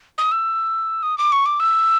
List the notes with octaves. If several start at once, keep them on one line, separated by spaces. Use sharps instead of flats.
D#6
E6
D#6
D6
C#6
D6
E6